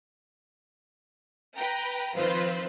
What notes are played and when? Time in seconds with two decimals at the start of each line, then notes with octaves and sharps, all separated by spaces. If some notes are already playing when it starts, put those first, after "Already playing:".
1.55 B4 G5 A#5
2.15 D#3 F3 C4 F4 B4 C5